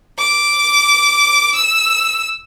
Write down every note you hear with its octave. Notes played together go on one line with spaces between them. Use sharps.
D6
E6